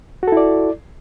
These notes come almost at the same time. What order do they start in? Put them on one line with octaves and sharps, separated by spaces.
F#4 A4 E4 D5